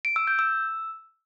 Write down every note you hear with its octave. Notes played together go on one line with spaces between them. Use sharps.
D7
E6
G6
E6